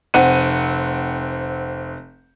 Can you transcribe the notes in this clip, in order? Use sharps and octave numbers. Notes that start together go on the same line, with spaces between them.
F1 C4 F#5 D#7